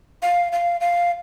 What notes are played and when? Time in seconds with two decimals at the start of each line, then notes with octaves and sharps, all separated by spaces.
0.22 F5
0.52 F5
0.81 F5